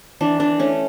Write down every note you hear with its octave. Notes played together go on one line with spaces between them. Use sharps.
E3 D4
E3 D4
A3 C#4